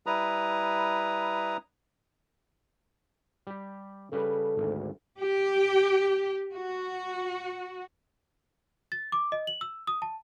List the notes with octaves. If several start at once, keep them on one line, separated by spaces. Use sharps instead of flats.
G3 E4 B4 A#5 D#6
G3 G4
C#3 G3 A4 B4
G#1 D2
G4
F#4
A6
D6
D#5
F#7
E6
D#6
A5